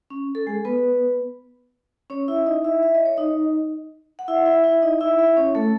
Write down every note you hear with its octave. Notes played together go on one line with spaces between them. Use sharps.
C#4
A4
G#3 G#4
B3 B4
C#4 C#5
E4 E5
D#4 D#5
E4 E5
E5
D#5
C#5
D#4 D#5
F#5
E4 E5
E4 E5
E4 E5
D#4 D#5
E4 E5
E4 E5
C#4 C#5
A3 A4